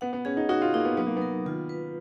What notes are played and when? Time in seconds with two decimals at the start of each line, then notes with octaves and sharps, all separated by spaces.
0.01 B3 F#5
0.13 B3
0.25 C#4 G#4
0.37 D#4
0.49 D#4 F#4
0.62 F4
0.74 A#3 D#4
0.85 B3
0.97 F#3 B3
1.07 A#3
1.17 B3
1.22 A#4
1.45 D#3 F4
1.69 B4